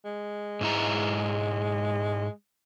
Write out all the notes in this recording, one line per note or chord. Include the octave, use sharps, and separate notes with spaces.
G#3
G#2 E4 A#5